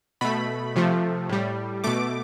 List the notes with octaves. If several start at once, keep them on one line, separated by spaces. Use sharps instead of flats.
B2 A3 B5
C3 F3 A3
A2 G3
B2 A3 D6